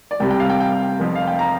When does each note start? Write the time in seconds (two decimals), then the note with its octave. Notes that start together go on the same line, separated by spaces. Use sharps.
0.11 D5
0.20 C2 C3 G3 G5
0.30 G5
0.40 F5
0.50 G5
0.60 G5
0.99 F1 F2 F3
1.15 F5
1.27 G5
1.39 A#5